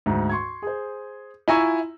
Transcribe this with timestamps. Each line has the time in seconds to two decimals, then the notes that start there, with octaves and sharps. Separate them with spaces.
0.06 D2 G#2
0.30 C6 C#6 G#6
0.62 G#4 C5
1.48 E4 F4 G#5 A#5 C#6 E6